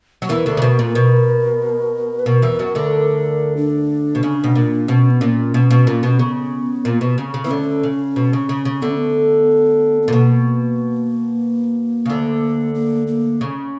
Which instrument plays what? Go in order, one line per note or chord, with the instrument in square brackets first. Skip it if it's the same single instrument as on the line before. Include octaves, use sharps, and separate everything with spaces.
[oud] F#3
[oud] E2 E3 [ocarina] A#4
[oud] D2 D3
C#3
B2
A#2
B2
[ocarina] B4
[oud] B2 [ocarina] A#4
[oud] E2 E3
F#2 F#3
D2 D3
[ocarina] D4
[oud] B2
C#3
B2
A#2
[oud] B2 [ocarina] C#4
[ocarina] B3
[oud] A#2 [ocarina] C#4
[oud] B2
B2
A#2
[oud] B2 [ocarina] C#4
[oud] C#3 [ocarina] B3
[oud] A#2
B2
C#3
C#3
[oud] E3 [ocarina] B3
[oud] D2 D3 [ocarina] C#4
[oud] C#3
B2
C#3
C#3
C#3
[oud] D2 D3 [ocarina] B3
[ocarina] C#4
B3
B3
[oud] A#2
[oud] B2 [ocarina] A#3
[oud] C#3
D2 D3
[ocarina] A#3
A#3
[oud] C#3